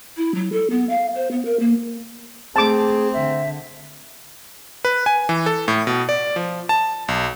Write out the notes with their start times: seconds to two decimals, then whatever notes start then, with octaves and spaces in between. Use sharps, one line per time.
0.17 E4
0.34 F#3
0.52 A4
0.70 B3
0.89 F5
1.15 C5
1.31 B3
1.45 A#4
1.59 A#3
2.56 A3 C4 G#4 A5 D6
3.13 D3 E5
4.85 B4
5.06 G#5
5.29 E3
5.46 A4
5.68 A2
5.87 B2
6.09 D5
6.36 F3
6.69 A5
7.08 B1